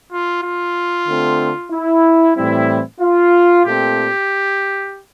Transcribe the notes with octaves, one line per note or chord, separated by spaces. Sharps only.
F4
F4
D3 A3 C4
E4
A2 E3 G3 C4 E4
F4
A#2 A3 C4 G4